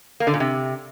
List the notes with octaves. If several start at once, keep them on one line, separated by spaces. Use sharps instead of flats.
A#3
D3
A#2
C3